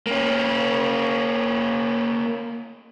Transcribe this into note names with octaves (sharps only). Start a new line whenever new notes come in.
A#3 C#4